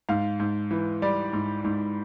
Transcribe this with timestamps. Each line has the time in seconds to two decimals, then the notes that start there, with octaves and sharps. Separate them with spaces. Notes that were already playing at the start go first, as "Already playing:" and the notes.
0.09 G#2 F5
0.40 G#2
0.71 E3
1.02 G3 D5
1.33 G#2
1.64 G#2